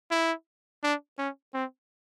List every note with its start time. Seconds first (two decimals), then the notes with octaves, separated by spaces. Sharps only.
0.11 E4
0.83 D4
1.18 C#4
1.54 C4